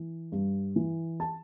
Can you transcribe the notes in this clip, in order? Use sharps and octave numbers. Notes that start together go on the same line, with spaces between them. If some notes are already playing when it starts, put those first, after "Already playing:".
Already playing: E3
G2
E3
A5